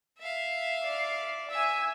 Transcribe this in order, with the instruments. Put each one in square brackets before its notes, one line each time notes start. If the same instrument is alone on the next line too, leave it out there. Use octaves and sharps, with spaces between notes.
[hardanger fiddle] E5 F5
[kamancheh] D5
[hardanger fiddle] E5 [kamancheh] G#5 E6